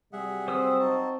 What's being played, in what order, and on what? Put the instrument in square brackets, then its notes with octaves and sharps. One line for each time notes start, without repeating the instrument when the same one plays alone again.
[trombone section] C3 F#3 G3 [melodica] G#4 E5 F#5
[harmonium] C4 [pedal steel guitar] C5 D#6 E6
[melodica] D#4 F#4 A5